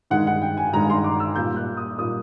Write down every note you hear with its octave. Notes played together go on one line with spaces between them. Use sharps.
G2 D#3 G#3 F#5
F#5
G5
G#5
G2 D#3 G#3 A#5
C6
D6
E6
A#2 G3 A#3 G6
F#6
D#6
A#2 G3 A#3 D#6